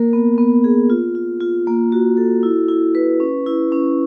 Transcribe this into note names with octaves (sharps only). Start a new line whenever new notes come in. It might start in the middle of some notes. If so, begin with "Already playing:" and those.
Already playing: A#3 A#4
B3
B3
G#4
F4
F4
F4
A#3
F#4
A4
E4
E4
B4
C#4
E4
C#4